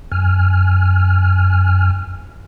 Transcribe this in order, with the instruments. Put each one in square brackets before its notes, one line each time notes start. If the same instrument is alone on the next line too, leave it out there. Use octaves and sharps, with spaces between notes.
[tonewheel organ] F#2 G#5 F6